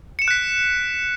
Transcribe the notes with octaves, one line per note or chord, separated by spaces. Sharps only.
F#6 B6 C#7 D7 E7